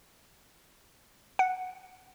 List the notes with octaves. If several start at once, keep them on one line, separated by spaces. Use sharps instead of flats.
F#5